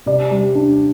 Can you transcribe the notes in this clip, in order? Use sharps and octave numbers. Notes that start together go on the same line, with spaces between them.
C3 D5
G3
D4